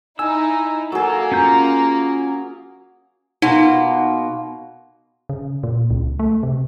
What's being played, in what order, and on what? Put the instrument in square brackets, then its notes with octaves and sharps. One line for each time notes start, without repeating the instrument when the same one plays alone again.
[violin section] D#4 E4 [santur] G#5 [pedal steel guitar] E6
[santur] F#3 G#4 [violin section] A#3 [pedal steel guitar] A4
[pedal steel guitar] C#4 F4 G6
[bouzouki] B2 A#3 F4 [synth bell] D#4
[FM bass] C#3
A#2
C#2
A3
C3